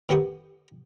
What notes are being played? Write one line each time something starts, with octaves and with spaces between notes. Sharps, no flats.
A2 D#3 B3 G4 C#6 D#6